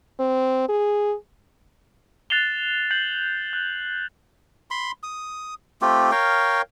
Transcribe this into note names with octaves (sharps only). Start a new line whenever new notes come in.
C4
G#4
F#6 A6 C7 E7 F7 G7
G6 C7 F#7
F#6
B5 C6
D#6
A3 C4 F4 G4
A#4 C#5 F5 G5